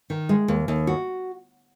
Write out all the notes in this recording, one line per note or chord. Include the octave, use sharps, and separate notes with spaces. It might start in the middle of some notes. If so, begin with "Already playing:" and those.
D#3
G#3
D#2
D#2
F#4